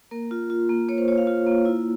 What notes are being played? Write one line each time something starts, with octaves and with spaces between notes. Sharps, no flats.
A#3 A#4
F4
F4
A#3
A#3 C#5
C5
F4 C#5
F5
F4
A#3
E4